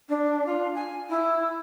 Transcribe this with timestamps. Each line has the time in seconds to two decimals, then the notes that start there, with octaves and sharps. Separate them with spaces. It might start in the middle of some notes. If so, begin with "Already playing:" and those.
0.08 D4
0.45 F4
0.75 G#5
1.09 E4